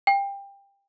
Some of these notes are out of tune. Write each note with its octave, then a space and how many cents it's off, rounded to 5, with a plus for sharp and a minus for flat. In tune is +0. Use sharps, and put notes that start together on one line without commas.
G5 +20